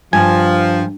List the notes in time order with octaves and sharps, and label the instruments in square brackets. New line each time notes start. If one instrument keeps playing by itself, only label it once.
[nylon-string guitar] G2 [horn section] F3 [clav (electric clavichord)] G#5